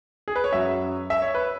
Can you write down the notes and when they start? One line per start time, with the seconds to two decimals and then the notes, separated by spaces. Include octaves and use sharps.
0.28 G#4
0.36 B4
0.44 C#5
0.52 F#2 F#3 C#4 E5
1.10 E5
1.22 C#5
1.35 B4